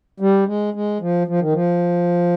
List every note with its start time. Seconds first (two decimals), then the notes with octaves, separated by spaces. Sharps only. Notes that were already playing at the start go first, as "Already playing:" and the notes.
0.20 G3
0.47 G#3
0.74 G#3
1.01 F3
1.27 F3
1.41 D#3
1.53 F3